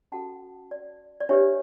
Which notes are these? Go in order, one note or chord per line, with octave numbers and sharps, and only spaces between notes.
C#4 F#4 A4 F#5 A5
D5
D5
D4 G4 B4 C#5 E5